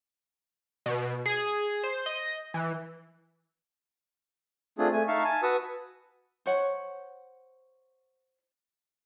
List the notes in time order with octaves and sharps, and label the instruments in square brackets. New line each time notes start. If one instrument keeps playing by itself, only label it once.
[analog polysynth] B2
G#4
C5
D#5
E3
[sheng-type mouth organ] A3 C4 D4 F4 G#4
A3 G#5
D#4 E5 F5 A5 C#6
G#5 A5
F#4 B4 A5 C#6 D#6 E6
[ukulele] C5 C#5 F#5